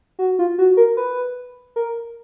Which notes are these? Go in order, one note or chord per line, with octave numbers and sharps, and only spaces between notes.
F#4
F4
F#4
A#4
B4
A#4